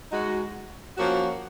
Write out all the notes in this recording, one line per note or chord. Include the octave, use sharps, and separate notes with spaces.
G#3 D#4 F#4
F3 A#3 C#4 F#4